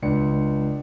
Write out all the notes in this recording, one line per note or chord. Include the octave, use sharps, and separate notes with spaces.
C#2 D4 C#7